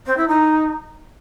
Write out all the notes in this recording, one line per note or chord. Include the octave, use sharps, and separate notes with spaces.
C4
E4
D#4